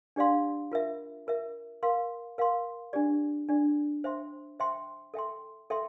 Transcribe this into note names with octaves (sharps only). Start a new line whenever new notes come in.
D4 G4 D5 F5 C6
F4 A#4 E5
F4 A#4 E5
A#4 F5 C6
A#4 F5 C6
D4 G4 D5
D4 G4 D5
C5 E5 G5 C6
C5 E5 G5 C6
A4 E5 G5 C6
A4 E5 G5 C6